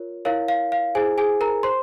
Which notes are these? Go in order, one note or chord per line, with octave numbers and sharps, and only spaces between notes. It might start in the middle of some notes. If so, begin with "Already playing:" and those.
Already playing: F4 A#4 C#5
E4 A#4 C#5 F5
F5
F5
E4 G#4 C5 G#5
G#4 G#5
A#4 A#5
C5 C6